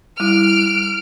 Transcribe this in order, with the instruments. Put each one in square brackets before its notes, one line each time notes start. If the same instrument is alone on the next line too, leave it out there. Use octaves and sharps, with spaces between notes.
[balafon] G3 E4 [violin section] F6 D7